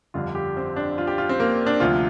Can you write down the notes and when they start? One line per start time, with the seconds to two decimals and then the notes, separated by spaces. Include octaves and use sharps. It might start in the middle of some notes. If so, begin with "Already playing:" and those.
0.14 G1 F2 D3 G3 F4
0.35 G4
0.57 C4
0.76 D4
0.98 F4
1.07 G4
1.18 F4
1.29 C4
1.40 A#3
1.66 D4
1.80 D2 C3 F3 F4